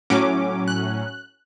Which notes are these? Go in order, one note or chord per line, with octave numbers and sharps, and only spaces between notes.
A2 F#3 C#4 D6
F#6